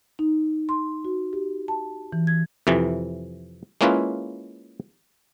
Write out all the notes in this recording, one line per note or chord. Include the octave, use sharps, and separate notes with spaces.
D#4
C6
F#4
G4
A5
E3
G#6
F2 C3 E3
G#3 A#3 C#4 E4 F4 B4